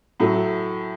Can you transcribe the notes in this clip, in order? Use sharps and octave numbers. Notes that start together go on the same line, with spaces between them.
A2 F#3 A3